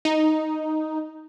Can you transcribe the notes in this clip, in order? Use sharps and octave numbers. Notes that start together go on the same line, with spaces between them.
D#4